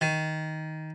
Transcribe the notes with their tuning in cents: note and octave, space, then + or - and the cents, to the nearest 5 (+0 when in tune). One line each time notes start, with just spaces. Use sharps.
D#3 +10